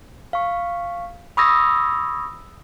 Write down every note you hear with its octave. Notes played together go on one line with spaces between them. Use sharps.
F5 C#6
B5 C#6 D#6 E6 G#6 A#6